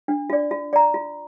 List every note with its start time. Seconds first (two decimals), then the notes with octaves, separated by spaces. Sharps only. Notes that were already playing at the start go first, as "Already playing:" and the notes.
0.08 D4
0.30 F4 D5
0.51 F4
0.73 D5 A#5
0.94 F4